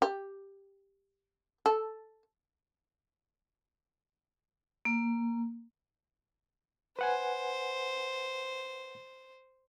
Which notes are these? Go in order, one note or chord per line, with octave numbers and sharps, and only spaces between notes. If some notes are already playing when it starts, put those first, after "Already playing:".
G4
A4
A#3
B4 C5 F#5 G#5